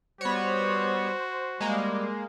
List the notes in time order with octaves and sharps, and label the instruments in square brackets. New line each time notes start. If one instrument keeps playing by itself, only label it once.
[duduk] G3 [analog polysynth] B3 C#5 [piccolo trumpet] F#4 [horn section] C5
[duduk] G3 [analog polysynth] G#3 A#3